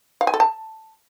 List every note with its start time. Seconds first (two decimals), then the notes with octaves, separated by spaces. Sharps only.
0.21 F5
0.27 G#5
0.34 A4
0.40 A5